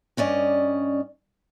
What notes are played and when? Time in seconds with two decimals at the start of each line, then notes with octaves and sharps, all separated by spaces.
0.17 G2 C#4 D5 D#5